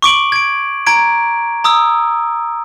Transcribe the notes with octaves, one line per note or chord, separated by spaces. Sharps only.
C#6 D6 D7 F#7
G#6 D7
A#5 G#6 D7
A#5 D#6 E6